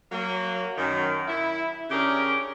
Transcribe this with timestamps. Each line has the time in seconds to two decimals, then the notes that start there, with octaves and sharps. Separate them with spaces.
0.12 F#3 A#3
0.78 F#2 D#3
1.28 E4
1.90 C#3 C#4 D4 G4 G#4 A#4